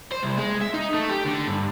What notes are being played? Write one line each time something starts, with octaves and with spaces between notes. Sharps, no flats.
C5
C2
G#3
E5
D#4
A3
G4
D3
G2